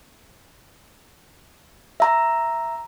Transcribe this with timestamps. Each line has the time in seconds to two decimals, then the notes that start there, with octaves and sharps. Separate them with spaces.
2.00 E5 A#5